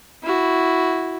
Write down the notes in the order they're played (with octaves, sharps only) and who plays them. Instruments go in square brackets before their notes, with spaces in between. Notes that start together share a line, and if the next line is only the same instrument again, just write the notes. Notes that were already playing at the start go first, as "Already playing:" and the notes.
[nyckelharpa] E4 F#4